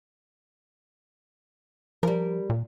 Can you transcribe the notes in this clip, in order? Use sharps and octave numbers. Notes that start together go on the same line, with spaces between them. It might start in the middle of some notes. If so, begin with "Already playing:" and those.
F3 G3 A#4
A#2